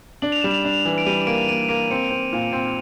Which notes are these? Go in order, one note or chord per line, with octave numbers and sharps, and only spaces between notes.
D4 F#7
F7
G3 E7
F7
D4
E3
D7
G3 D#7
A#3 D7
A#3 D#7
A#3 D7
C4 C#7
C4
A#2
C4